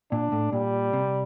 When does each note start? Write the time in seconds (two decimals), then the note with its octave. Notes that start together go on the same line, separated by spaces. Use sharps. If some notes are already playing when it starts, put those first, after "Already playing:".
0.11 A#2 D4
0.32 A2
0.52 A#2 G3
0.93 C3